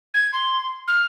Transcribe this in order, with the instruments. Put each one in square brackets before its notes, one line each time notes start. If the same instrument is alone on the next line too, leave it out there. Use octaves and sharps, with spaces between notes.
[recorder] G#6
C6
F6